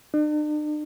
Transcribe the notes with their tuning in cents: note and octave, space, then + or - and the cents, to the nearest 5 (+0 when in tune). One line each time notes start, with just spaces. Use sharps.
D4 +45